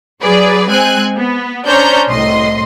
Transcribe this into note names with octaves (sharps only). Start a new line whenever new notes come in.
F#3 G#4 B4 D5
G#3 C4 G#5 F#6
B3
C#4 D4 C5 C#5 A#5 G6
C2 A2 D#5 C6